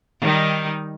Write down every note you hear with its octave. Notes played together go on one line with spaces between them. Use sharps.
D#3 G3 D#4